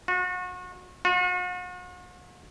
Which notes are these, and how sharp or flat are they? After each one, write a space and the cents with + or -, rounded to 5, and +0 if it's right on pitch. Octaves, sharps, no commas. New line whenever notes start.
F#4 -35
F#4 -45